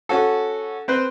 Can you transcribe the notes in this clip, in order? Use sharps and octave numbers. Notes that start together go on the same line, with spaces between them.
C#4 F#4 A4
C4 B4 C5